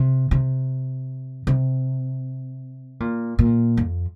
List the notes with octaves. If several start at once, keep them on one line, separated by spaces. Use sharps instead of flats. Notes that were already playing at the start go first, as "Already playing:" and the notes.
Already playing: C3
C3
C3
A#2
A#2
F2